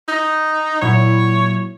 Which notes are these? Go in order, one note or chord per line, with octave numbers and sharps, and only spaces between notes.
D#4
A#2 F#3 E4 C#5